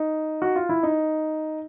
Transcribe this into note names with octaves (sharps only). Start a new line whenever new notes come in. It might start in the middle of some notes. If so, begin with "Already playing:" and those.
Already playing: D#4
F#4
F4
E4
D#4